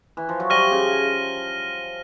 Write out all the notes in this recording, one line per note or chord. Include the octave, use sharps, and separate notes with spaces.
E3
F3
F#3
F3 G3 F6 A#6 D#7 G7
C#3